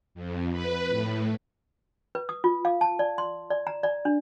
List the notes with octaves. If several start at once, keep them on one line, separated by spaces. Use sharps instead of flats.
F2
B4
A2
B4
D#6
F4
F5
A5
D5
C6
D5
A#5
D5
D4